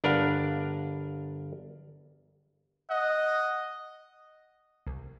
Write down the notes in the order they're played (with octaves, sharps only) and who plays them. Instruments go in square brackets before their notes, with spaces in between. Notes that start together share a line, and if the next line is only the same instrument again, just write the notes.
[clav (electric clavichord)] G1 D4 A#4 B4 F5 F#5
[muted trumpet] D#5 [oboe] F#5
[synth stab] C2